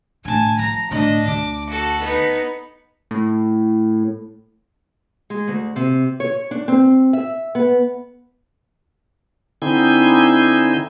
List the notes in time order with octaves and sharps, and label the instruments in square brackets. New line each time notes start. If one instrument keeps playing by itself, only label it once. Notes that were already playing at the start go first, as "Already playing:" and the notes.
[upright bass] A2 D3 [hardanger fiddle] G#5 A5
[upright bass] F3 [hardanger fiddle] A#5
[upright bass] A2 D3 [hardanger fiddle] D4 D#5
[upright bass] D2 [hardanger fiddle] D6
[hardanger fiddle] F#4 A4
B3 D#4
[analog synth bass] A2
[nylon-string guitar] G#3
D2
C3
C#5
D4
C4
E5
B3
[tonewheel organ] D3 C4 D#4 E4 G#5 G6